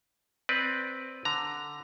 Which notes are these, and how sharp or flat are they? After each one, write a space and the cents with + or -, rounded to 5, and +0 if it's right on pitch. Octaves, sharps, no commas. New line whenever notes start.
C4 +0 B4 +0 D5 +0
D3 +0 A#5 +0